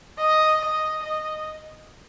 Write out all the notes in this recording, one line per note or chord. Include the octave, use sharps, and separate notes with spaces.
D#5
D#5
D#5